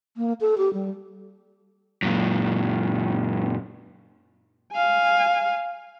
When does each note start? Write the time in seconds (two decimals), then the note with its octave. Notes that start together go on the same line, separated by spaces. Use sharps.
0.17 A#3
0.41 A4
0.58 G4
0.73 G3
2.02 F#2 A#2
4.73 F5 G#5